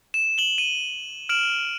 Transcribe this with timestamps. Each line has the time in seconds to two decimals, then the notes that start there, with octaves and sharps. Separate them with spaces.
0.14 E7
0.38 F#7 G7
0.58 D#7
1.29 F6 D7 E7 F#7